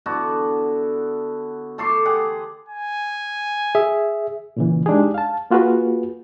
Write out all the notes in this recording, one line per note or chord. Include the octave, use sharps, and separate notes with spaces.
D3 B3 E4 F#4
A3 A4 C6 D6
G4 G#4 F#5
G#5
G#4 E5
A#2 C#3 E3
G#3 D4 D#4 G4 G#4
F5 A5
A#3 F4 F#4 G#4 B4